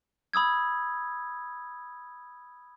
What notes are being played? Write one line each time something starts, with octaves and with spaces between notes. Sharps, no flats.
B5 D#6 E6 G#6